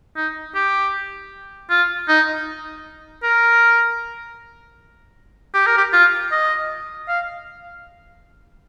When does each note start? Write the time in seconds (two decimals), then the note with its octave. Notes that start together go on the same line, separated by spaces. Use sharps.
0.16 D#4
0.55 G4
1.70 F4
2.08 D#4
3.23 A#4
5.54 G4
5.66 A#4
5.77 G4
5.93 F4
6.31 D#5
7.08 F5